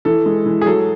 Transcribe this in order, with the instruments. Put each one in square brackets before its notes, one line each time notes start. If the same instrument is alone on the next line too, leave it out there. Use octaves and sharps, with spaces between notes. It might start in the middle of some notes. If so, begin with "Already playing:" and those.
[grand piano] E3 A4
G#3
E3
G#4
F#3 A4